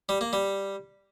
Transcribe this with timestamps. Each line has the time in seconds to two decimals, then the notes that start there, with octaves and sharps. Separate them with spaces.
0.09 G3
0.21 A#3
0.33 G3